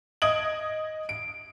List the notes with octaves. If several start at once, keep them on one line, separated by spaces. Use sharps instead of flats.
D#5 D#6 G#6 D7 F#7
D7